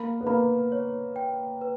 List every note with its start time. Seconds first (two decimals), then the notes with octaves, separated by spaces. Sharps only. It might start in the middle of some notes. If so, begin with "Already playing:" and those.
Already playing: A#3 B5
0.21 B3
0.26 A#3 B5
0.72 C#5
1.16 G5
1.61 B4